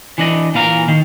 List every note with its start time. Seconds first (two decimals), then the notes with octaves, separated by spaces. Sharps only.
0.18 E3 D4 D#5
0.54 A#2 E3 F5 A#5
0.88 D#3